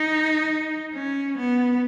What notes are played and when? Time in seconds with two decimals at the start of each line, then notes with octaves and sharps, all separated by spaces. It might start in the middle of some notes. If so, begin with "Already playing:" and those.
Already playing: D#4
0.94 C#4
1.37 B3